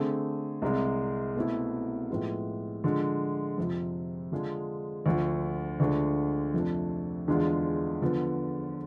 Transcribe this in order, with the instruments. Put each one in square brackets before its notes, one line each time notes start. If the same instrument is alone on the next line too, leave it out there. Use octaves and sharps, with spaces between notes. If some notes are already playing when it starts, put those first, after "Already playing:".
Already playing: [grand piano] D3 A3 C4 G#4
C2 C3 G#3
B2 A3 C4 E4
A2 F3 G#3 B3
D3 F3 G#3
F2 C3 F3
D3 G#3 D4 F4 G#4
D2 D3 F3
D2 D3 G#3 D4 F4
F2 C3 F3 A3 D4
E2 D3 G#3 D4 F4
D3 F3 B3